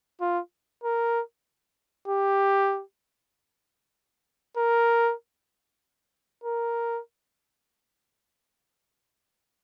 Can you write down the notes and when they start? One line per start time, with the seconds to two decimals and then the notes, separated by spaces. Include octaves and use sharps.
0.21 F4
0.84 A#4
2.08 G4
4.57 A#4
6.44 A#4